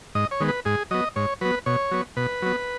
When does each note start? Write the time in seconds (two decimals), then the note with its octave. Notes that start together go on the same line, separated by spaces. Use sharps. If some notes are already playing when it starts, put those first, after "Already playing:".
0.15 G#2 D#5
0.31 C#5
0.40 D#3 G#3 B3
0.48 B4
0.65 G#2 G#4
0.91 F#3 B3 D#5
1.16 G#2 C#5
1.41 F#3 B3 B4
1.66 B2 C#5
1.91 F#3 B3
2.17 B2 B4
2.42 F#3 B3